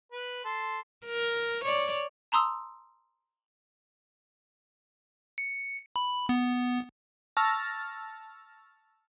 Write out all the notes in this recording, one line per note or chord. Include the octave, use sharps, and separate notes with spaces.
B4
A4 C6
A#4
C#5 D5
A5 A#5 C6 D#6 E6
C#7
B5
B3
A5 C#6 E6 F6 A6 A#6